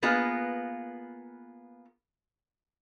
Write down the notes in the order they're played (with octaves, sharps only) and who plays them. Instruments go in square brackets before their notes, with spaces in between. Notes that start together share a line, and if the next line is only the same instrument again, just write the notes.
[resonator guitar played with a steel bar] A#3 B3 F4 G#4 B4 D#5